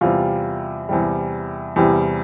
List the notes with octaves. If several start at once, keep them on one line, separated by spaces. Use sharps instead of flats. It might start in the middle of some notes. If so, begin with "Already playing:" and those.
E2 C3 G3 F4
E2 C3 G3
E2 C3 G3